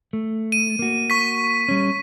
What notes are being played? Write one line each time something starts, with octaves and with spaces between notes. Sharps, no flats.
A3
D#7
A#3 F#4
C#6 B6
G3 C#4